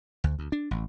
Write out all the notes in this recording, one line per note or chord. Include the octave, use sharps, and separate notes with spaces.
D2
D2
D4
A1